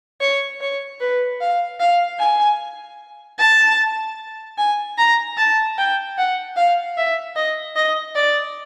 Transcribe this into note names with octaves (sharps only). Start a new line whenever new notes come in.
C#5
C#5
B4
F5
F5
G#5
A5
G#5
A#5
A5
G5
F#5
F5
E5
D#5
D#5
D5